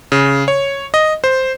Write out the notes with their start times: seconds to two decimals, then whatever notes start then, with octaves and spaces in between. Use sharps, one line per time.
0.12 C#3
0.48 C#5
0.94 D#5
1.24 C5